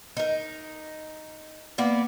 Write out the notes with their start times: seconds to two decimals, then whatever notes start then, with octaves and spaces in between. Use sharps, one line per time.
0.17 D#4 A#4
1.78 A#3 B3 D5